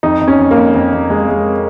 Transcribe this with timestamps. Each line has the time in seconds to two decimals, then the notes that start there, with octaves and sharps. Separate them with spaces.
0.03 F2 D#4
0.21 F2
0.28 C#4
0.39 F2
0.51 A#3
0.57 F2
0.74 F2
0.93 F2
1.10 G#3
1.28 G#3